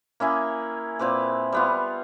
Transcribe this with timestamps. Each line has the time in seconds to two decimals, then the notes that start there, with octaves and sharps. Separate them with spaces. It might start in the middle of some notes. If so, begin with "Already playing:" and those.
0.20 A#3 C#4 E4 G#4
0.99 A#2 C4 B4 D6
1.52 G3 B3 F4